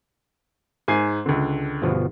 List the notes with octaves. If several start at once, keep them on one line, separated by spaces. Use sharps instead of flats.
G#2 G#5 C7
C#2 D3
G1 B2 F3